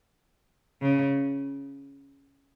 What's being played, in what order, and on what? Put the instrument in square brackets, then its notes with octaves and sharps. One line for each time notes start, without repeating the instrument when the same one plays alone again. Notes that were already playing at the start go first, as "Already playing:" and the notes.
[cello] C#3